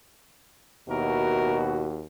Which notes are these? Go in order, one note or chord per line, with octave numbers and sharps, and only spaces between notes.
D#2 B2 E4 F#4 A#4